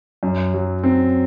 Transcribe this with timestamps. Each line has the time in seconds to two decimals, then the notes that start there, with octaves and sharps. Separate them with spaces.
0.23 F#2
0.54 F#3
0.84 C4